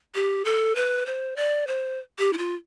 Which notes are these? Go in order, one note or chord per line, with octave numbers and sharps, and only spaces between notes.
G4
A4
B4
C5
D5
C5
G4
E4
F4